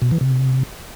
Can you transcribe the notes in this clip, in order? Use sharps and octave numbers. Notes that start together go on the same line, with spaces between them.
B2
E3
C3